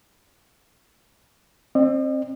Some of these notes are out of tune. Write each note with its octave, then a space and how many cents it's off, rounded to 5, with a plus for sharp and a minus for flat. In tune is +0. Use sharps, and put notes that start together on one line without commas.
C4 +25 D#5 -45